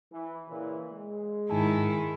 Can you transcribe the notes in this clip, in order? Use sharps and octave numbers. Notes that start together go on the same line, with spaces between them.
E3
A#2 C#3 E3
G#3
G#2 D#3 E4 G#5 A5